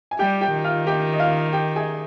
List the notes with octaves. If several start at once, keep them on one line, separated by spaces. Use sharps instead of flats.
G#5
G3 G4 G5
G4 G5
D#3
F4 F5
G4 G5
D#5
F4 F5
G4 G5
G#4 G#5